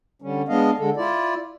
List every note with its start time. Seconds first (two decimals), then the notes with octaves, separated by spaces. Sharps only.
0.22 D3 G3 C#4
0.48 G#3 B3 D4 D#5 F5
0.78 D3 G#3 A4
0.97 E4 F4 D5